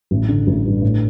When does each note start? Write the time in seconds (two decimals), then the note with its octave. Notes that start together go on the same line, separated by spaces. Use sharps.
0.11 A1
0.28 D3
0.47 A1
0.65 G2
0.82 A2